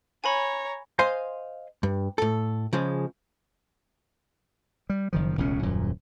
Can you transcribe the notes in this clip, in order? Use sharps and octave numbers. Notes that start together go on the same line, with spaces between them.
C#5 G#5 A#5 B5
C5 D#5 F5 G#5 C6
G2
A2 A4
C#3 F3 G#3
G3
F#1 D#3 F3
E1 C#2 A2 C#4
D#1 F#2 A#2